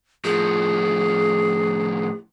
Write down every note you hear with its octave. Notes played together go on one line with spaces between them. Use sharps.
A2 F3 G#4